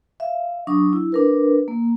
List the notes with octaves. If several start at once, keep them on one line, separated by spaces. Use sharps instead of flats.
E5 F5
F#3 D4 C#6 D#6
E4
D4 A#4 B4
A#3